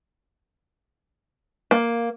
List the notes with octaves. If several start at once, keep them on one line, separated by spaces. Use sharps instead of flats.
A#3